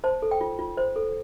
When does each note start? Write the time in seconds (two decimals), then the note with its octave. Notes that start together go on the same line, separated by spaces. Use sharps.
0.04 C5 A5
0.22 A4
0.31 G5
0.41 F4
0.59 F4
0.77 C5
0.96 A4